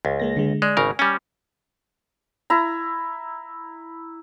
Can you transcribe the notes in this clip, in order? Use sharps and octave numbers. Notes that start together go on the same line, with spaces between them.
C#2
G#3 A#3 A#6
D3 G#3
G#3 D5
G#1 C#3 A#4 G#5
G3 C#4 G#5
E4 A#5